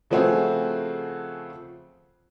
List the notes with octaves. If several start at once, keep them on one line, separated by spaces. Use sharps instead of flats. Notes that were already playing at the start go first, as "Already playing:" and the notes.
C#3 F3 A3 C4 F#4 G#4